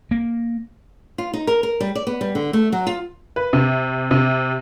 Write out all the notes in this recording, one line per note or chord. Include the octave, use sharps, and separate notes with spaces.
A#3
F4
D#4
A#4
A#4
G3
D5
B3
G3
D3
A3
F#3
F4
B4
C3
C3